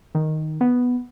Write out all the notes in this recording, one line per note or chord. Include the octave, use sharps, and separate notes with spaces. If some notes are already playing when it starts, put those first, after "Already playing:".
D#3
B3